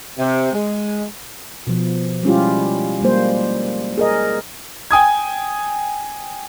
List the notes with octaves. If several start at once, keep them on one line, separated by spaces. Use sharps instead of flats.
C3
G#3
B2 F3
G3 G#3 C#4 E4 F4 G4
G3 G#3 A#3 C5
G#4 A#4 D#5
G5 G#5 D#6 G#6